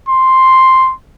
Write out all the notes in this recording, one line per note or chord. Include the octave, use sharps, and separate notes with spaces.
C6